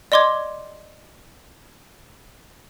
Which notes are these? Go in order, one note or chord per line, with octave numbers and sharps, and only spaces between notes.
D5 D#5 C6 D6 G#6